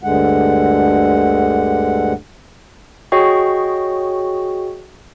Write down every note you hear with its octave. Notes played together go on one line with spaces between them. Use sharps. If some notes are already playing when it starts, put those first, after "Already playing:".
D2 G2 D3 G#3 F#5
F#4 G#4 C#5 D#5 G5 C#6